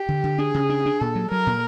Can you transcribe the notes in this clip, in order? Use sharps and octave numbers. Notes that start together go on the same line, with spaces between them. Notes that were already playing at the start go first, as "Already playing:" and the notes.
Already playing: G4
D3
D3
D4 G#4
C#3
D4
D4
A#2 A4
F#3
F#3 A#4
A#2